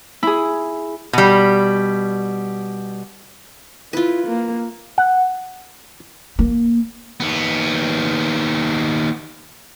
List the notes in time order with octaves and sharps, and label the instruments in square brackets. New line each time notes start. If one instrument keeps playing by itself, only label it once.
[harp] E4 G#4
[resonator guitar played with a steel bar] B2 G3
[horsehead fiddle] E4 [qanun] F4 B4
[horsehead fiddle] A#3
[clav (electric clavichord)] F#5
[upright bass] A#3
[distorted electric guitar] D#2 B3